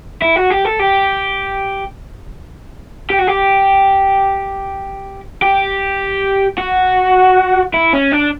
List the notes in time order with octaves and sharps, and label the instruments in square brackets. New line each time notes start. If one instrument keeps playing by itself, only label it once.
[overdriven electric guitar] E4
F#4
G4
A4
G4
G4
F#4
G4
G4
F#4
E4
C#4
D4